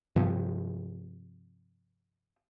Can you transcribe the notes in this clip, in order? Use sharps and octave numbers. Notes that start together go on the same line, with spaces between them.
G2 C3 F3 C4